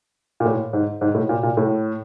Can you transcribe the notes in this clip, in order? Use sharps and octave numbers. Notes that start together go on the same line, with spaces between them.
A#2
A2
G#2
G#2
A2
A#2
A#2
A2